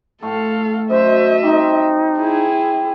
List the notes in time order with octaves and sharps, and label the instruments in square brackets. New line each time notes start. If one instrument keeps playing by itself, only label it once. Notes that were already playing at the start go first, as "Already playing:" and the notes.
[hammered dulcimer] A2 A3 C6 [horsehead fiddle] A4 F5
[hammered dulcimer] F#2 [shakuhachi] C5 [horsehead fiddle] D#5 E5
[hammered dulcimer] G3 C4 [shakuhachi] D#4
[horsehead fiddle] E4 G#4